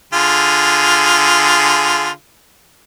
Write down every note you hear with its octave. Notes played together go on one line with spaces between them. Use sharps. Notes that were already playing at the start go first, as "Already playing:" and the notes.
D3 F4 G#4